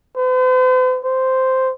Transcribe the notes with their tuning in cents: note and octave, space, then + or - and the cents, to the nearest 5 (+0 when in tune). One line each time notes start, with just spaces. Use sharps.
C5 -45
C5 -5